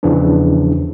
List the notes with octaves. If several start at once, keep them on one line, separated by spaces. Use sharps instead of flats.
E2 C#3 E3 F3 D4